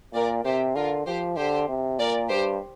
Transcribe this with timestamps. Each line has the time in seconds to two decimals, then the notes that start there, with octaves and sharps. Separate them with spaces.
0.13 A#2 A#4 D5
0.45 C3 G4 C5
0.75 D3 F4 A#4
1.06 F3 G4 C5
1.37 D3 G4 C5
1.69 C3
1.99 A#2 A#4 D5
2.30 G2 G4 C5